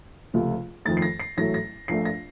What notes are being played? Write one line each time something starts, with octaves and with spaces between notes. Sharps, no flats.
C#2 C3 F3 A3
F2 D#3 A3 A6
C7
A#6
C7
A1 A2 F#3 A3 A#6
A#6
A#1 A#2 A3 C7
A#6